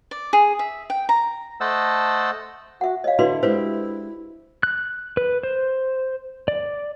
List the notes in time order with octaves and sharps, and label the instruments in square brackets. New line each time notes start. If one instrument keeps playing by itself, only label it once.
[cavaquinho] D5
G#4
E5
G5
A#5
[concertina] A3 C5 D#5 F#5 A5 E6
[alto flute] F#4 [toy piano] E5 F#5
[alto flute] C#5 [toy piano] D#5 F5
[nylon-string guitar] D3 D4 E4 [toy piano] F#4 B4 C6
[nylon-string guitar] G#3 D4 G4 [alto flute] E4 [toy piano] B4 C5
[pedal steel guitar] F#6
B4
C5
D5